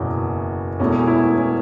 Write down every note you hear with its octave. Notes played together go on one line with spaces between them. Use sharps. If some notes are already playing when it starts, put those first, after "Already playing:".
Already playing: F#1 E2 B2 C#4
E1 E2 B2 A3 C#4
E4
C#4